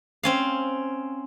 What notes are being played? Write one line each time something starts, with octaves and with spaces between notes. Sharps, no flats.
C4 C#4 F5